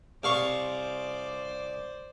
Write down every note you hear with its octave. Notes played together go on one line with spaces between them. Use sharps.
C2 C5 D5 F5 C#6